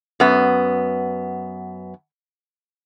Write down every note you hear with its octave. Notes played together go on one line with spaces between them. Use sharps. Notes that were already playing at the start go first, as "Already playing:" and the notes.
F#2 B3